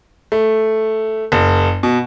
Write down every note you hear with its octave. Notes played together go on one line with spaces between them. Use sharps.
A3
F#1
B2